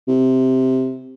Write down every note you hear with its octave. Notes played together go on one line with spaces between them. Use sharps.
C3